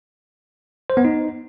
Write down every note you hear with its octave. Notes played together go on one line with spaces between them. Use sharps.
C5
B3
D#4